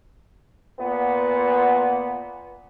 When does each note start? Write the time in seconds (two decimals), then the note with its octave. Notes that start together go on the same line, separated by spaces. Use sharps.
0.80 A#2 B3